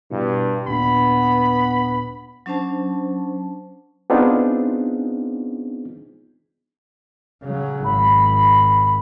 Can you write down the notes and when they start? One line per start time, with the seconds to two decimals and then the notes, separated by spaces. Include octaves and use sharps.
0.11 G2 B2 E4
0.67 D#2 A#2 B3 D4 B5
2.46 F#3 C#4 D4 C5 A5
4.10 B3 C4 D4 D#4 F4 G#4
7.43 C#3 F#3
7.84 G#1 B5